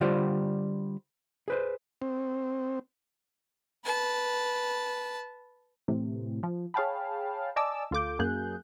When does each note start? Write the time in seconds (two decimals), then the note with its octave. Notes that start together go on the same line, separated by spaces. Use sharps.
0.01 D3 G3 F4 G4 C5 D5
1.48 G#4 B4 C5
2.02 C4
3.84 B4 A5
5.88 A2 C3 E3 A3
6.43 F3
6.74 G#4 C#5 F5 G5 A5 B5
7.56 D5 D#5 G#5 A5 D6 E6
7.91 D2 F4 A4 D6 G6
8.19 F#2 A#3 G#4 F#6 G6